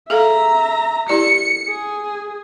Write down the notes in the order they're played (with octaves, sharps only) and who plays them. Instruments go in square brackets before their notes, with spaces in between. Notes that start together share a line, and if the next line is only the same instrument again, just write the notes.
[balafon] G#4 A4 F5 [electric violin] E5 A#5
[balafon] E4 G4 D5 [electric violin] C#7
[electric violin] G#4